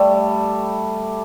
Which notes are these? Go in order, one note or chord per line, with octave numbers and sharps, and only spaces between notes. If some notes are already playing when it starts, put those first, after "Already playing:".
Already playing: G3 A3